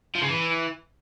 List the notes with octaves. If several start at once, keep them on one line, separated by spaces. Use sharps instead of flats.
F3
C#3
E3